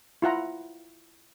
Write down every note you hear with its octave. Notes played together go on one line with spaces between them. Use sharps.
E4 F4 F#5 A#5